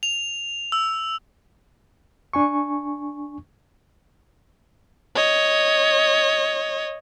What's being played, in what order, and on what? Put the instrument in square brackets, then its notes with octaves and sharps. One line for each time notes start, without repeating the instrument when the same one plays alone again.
[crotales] F7
E6
[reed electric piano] D4 G#5 C#6
[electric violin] C#5 D#5